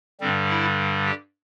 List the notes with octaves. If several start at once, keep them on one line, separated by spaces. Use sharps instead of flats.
G2 D3 G3 C4
E4
G4